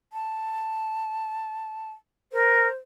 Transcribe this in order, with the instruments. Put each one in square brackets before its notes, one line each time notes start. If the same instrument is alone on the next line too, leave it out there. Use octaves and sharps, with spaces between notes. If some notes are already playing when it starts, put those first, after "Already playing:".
[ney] A5
[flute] A#4 [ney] C5